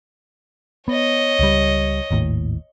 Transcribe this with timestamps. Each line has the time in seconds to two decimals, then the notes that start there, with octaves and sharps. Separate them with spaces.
0.88 B3 C#5 D#5
1.39 C#2 G3
2.11 G#1 D#2 A2